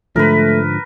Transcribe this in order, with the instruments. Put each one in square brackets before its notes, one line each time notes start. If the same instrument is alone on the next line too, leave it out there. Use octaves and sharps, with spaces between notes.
[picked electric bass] G#2 D3 F3 [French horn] A3 [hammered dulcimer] A#4 B4